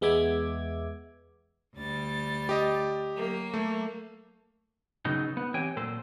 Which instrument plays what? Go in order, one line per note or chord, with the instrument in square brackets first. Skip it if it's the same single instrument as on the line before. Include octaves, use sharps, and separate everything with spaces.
[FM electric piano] E2 G#3 B3 E5 D6 G#6
[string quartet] D2 G3 A6
[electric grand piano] G4 D#5
[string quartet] F#3 A#3
[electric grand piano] A3
[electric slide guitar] C#3 F#3 B3 D#4
B3
E3 C4 G4 C#5 G5 G#5
A#2 F#3 A4 C5